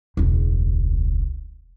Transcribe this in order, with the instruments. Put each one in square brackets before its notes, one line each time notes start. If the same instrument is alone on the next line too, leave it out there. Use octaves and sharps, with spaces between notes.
[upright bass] E1 C#2